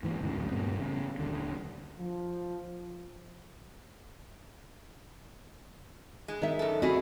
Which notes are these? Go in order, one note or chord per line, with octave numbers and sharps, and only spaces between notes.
G#2 E3 A#3
D2 G#2 C#3
D1 G2
D2 G2 A#2 C4
A1 C#3
D#1 D3
F3
G#3
D#3 E5
F#2 A4
A3 C4 E4 F#4 G#4 D#5